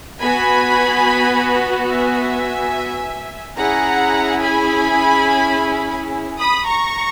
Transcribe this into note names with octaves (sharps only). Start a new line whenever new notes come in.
B3 F#4 G#5 B5
E5 G#5
C#4 E4 G#4 F#5 A#5
G#5 B5
B5 D#6
A#5 C#6